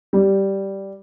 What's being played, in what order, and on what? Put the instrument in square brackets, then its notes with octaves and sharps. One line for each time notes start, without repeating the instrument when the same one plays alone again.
[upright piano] G3